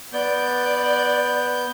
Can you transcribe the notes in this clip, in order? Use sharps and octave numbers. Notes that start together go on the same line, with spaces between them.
B3 D5 G6